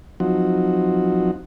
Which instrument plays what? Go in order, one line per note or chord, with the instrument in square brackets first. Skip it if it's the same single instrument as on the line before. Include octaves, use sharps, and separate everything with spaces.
[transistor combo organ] F3 F#3 C4 D#4 F#4